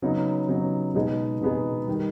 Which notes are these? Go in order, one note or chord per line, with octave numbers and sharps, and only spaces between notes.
C#3 F#3 B3 D#4
C#3 F#3 B3 D#4
B2 G#3 B3 D#4 G#4
B2 G#3 B3 D#4 G#4
D#3 G3